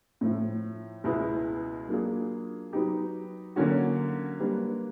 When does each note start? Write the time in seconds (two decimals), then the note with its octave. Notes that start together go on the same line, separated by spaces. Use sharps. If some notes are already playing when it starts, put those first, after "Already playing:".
0.21 A2 F3 A3
1.04 C#2 B2 G#3 B3 E4
1.89 F#3 A#3 D4 F4 G#4
2.73 F#3 B3 D#4 G4
3.56 D3 F#3 A#3 C#4 F#4
4.40 G3 A#3 D4 G4 B4